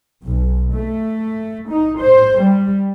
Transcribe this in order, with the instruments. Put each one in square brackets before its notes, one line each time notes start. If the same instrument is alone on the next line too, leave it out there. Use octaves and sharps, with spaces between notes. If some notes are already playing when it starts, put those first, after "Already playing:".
[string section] B1
A3
D#4
C5
G3